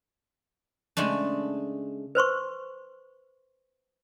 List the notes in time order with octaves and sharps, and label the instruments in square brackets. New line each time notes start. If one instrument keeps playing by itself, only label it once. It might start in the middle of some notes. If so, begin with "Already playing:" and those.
[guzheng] C#3 G#3 A3 D4
[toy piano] B4 C5 C6 C#6